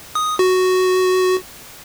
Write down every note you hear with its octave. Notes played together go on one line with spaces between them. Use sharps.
D#6
F#4